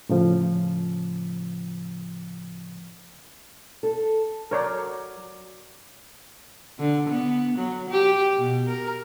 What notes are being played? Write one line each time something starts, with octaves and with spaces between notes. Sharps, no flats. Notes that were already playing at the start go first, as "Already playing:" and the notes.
A2 C#3 F3
A4
F#3 A#4 C#5 D5
D3
B3
F#3
G4
B2
A#4